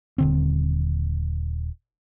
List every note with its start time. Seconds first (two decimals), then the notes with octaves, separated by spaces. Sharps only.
0.18 D#1 D3 C4